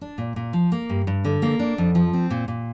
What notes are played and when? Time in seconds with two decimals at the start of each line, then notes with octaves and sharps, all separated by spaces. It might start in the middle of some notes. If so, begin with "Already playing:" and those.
0.01 D4
0.18 A#2
0.36 A#2
0.53 F3
0.72 A#3
0.90 G2
1.07 G2
1.25 D3
1.42 A#3
1.59 D4
1.78 F2
1.95 F3
2.13 C4
2.31 A#2
2.48 A#2